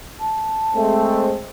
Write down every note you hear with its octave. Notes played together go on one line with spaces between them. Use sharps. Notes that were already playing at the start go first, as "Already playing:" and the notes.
A5
G#3 A3 C4